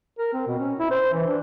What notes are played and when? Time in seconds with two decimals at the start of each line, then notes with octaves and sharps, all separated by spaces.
0.19 A#4
0.33 C4
0.47 B2
0.59 C#4
0.79 E4
0.91 C5
1.13 E3
1.27 D4